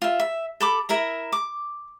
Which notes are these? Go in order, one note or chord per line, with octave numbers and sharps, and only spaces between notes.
F4 E5
E5
A4 B5 D6
E4 A#4 E5 A#5
D6